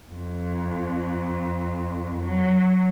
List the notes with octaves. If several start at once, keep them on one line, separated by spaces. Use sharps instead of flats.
F2
F#3